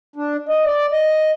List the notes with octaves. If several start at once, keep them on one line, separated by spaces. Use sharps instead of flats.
D4
D#5
D5
D#5